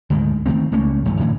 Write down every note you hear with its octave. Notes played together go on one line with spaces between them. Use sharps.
D2 G#2 D3 D#3
D#3 E3 A3 C4
C#2 A3 A#3 C#4
A1 G2 D#3 A3
A2 D3 E3 A3